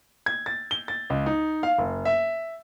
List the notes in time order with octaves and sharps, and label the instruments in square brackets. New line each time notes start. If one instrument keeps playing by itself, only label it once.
[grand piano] G#6
A6
G7
A6
C#2
D#4
F5
F#1
E5